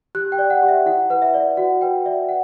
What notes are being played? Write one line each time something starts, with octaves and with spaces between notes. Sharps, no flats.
G4 F#6
G5
D5
F#5
G4
E5
E4 F#5
B4 F#5
E5
D5
F#4 F#5
B4 G5
D5 E5
F#5